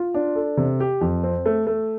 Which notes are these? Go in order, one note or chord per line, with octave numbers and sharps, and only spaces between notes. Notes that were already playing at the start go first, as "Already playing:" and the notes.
Already playing: F4
D4
A4
C3
G4
F2
C4
A3
A3